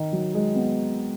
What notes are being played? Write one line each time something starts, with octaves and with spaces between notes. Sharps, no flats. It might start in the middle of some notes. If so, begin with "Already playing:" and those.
Already playing: D#3
F#3
G#3
B3